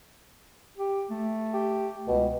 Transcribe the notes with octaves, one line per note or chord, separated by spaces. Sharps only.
G4
A3
G4
C#2 B2